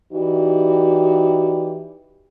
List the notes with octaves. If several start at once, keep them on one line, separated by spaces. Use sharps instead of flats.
E3 D#4 F#4 G4 D5